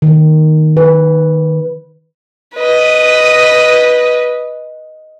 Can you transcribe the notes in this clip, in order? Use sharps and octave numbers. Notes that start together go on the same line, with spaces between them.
D#3
B4
B4 D#5